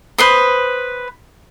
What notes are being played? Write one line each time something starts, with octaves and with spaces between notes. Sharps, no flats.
B4 C5 D#6